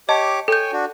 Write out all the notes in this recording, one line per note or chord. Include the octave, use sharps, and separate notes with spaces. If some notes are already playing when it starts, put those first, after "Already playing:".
G4 C#5 D#5 A5 D6
A4 C#5 G5 G#5 G6
D4 F#4